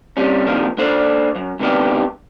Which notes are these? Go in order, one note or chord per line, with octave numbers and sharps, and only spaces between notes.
C3 G3 C#4
D#2 C3 D#3 F3 D4
D4 A4 C5 D5
F#2
G#2 C3 D#3 B3 D4 G4